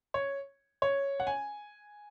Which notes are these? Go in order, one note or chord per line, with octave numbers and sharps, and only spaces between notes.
C#5
C#5
F#5
G#5